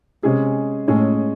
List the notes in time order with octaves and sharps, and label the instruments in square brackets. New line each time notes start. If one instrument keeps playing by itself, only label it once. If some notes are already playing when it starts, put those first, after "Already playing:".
[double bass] C3 [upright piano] G#3 C#4 G#4
[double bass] A2 [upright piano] G#3 C#4 G#4